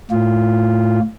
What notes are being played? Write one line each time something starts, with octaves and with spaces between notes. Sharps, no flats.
A2 F4